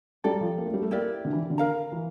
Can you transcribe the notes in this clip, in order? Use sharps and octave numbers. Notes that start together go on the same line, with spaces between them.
G3 A4 D5 G5 A#5
F3
A#3
A3
G3
A3
A#3 E4 G4 A#4 D5
D3
E3
D3
A#4 F5 A#5
E3